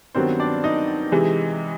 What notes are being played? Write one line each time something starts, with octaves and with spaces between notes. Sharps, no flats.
G2 D#3 F#3 B3 C4 C5
D4 D5
D#4 D#5
C3 E3 G#3